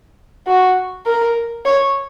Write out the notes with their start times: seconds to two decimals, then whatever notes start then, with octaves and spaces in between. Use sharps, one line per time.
0.47 F#4
1.06 A#4
1.65 C#5